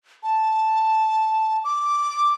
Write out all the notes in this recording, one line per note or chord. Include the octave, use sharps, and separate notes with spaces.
A5
D6